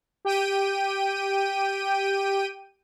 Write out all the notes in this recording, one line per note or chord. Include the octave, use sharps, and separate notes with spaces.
G4 G5 D#7